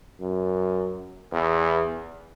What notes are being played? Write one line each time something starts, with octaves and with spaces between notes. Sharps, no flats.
F#2
E2